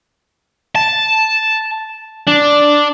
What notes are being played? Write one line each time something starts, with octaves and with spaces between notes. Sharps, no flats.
A5
D4